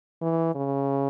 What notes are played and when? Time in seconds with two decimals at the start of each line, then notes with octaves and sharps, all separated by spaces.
0.22 E3
0.55 C#3